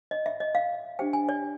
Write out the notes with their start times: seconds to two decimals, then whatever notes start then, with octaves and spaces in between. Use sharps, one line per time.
0.11 D#5
0.26 E5
0.40 D#5
0.55 F5
0.99 D4 G4 C5 G5
1.13 G#5
1.29 D5